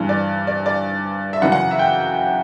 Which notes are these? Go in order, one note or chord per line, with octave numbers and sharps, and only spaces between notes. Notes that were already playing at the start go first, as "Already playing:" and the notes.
Already playing: G2 E3
D5
D5
D5
E5
F#2 C#3 E3 F#5
F#5
E5
G5